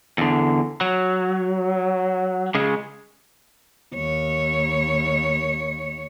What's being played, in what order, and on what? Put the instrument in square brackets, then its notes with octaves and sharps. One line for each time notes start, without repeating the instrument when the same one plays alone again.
[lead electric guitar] E2 D3
F#3
C#3 G#3
[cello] D#2 C#5